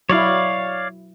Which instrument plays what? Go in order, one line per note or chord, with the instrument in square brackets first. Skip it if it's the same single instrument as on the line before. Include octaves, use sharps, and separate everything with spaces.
[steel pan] F#3 E4 [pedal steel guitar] C#5 D5 F5